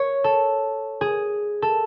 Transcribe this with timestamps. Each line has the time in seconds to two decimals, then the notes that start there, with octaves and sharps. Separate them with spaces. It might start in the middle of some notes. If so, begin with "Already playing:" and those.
Already playing: C#5
0.24 A4
1.01 G#4
1.62 A4